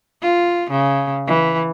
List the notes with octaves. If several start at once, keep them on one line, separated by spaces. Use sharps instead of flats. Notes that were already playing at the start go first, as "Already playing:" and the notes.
F4
C#3
E3